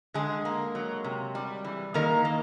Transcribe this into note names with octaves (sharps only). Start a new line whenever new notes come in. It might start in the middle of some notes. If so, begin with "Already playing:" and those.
D3 G#3 G#4
A#3
F#3
C3
G3
E3
D#3 A#3 A#4
A#3